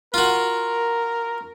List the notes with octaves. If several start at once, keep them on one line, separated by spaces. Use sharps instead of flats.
F4 F#4 A#4